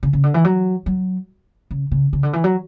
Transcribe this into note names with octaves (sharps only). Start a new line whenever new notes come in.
C#3
C#3
D3
E3
F#3
F#3
C#3
C#3
C#3
D3
E3
F#3